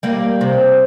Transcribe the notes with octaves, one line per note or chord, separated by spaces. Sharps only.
G3 A#3
C3